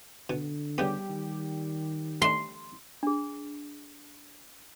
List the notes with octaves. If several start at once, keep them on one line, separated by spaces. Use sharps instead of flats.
B2 D3
C#3 G3 B3 G4
D#3
A3 D4 C6
D4 G#4